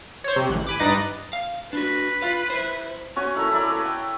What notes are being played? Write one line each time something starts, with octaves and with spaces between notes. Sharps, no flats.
C5 C#5
C3
A1 F#6
G#5 B5 D6
G2 D#4 B4 D5 D#5 D6
F5
D4 F#4 B4
F4 F5
E4 C5
C#4 F#4 C#5 G#5
C#4 E4 A4 A#4
E4 A4 A#4 D5
B4 C#5
G5